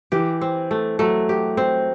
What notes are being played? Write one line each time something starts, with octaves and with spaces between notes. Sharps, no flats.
E3 G4
C4
A3
F#3 A3
G4
C4